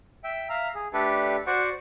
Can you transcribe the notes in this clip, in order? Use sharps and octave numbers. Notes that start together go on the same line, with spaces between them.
E5 G5
E5 F5 A#5
G#4
A3 D4 G4 A4 B4 D5
F#4 C5 D5 F#5 C#6